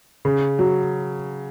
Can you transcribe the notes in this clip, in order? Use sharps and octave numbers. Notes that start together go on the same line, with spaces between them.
C#3
F#3